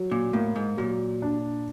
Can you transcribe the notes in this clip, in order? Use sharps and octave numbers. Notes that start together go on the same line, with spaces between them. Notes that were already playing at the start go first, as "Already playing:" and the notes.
Already playing: F#3
A#2
A2 A#3
G#2
A#2 F#3
D4